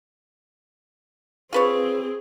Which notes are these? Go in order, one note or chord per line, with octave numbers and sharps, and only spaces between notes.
C4 F4 G#4 B4 C#5